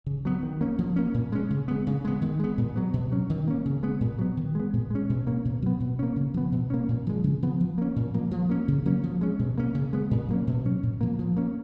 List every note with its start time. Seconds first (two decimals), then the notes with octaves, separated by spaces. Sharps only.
0.06 C#3
0.25 F#3 B3
0.43 D#3
0.61 A#3 C#4
0.79 F3
0.96 A#3 C#4
1.14 A#2
1.32 G#3 C#4
1.50 C#3
1.68 G#3 B3
1.87 C#3
2.05 G#3 B3
2.22 D#3
2.40 G#3 B3
2.58 A#2
2.76 F#3 B3
2.93 B2
3.12 F#3 C#4
3.30 D#3
3.48 A#3 C#4
3.65 C#3
3.83 G#3 B3
4.01 A#2
4.19 F#3 B3
4.37 D#3
4.55 G#3 B3
4.73 A#2
4.90 G#3 C#4
5.09 B2
5.27 A#3 C#4
5.45 B2
5.62 F#3 B3
5.80 B2
5.99 A#3 C#4
6.16 C#3
6.34 F3 B3
6.52 B2
6.70 A#3 C#4
6.88 A#2
7.07 F3 G#3
7.24 C#3
7.43 F3 B3
7.60 F3
7.78 A#3 C#4
7.96 A#2
8.14 F3 A#3
8.31 F3
8.50 A#3 C#4
8.68 C#3
8.86 F#3 A#3 C#4
9.04 F3
9.21 G#3 C#4
9.39 B2
9.58 A#3 C#4
9.75 C#3
9.93 G#3 B3
10.11 A#2
10.28 F#3 A#3 C#4
10.47 B2
10.65 F#3 C#4
10.83 A#2
11.01 F3 A#3
11.19 F3
11.37 A#3 C#4